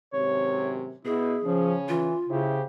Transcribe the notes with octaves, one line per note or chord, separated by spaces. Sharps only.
G#1 F#2 C3 C#5
B2 E4 G#4
C#3 F3 C#4
E3 F4
C#3 E4 G4 C5